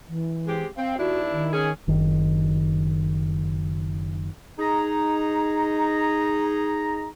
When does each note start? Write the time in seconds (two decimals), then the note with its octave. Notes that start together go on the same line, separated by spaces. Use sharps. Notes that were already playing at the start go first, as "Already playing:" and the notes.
0.08 E3
0.47 G#3 C4 G4
0.77 C4 F5
0.98 D#2 D4 E4 F#4
1.30 D#3
1.53 C#4 G#4
1.88 F#1 D#3
4.59 D#4 G#4 A#5